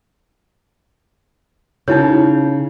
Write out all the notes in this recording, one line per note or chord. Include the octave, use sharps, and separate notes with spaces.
C#3 D#4 E4 C#5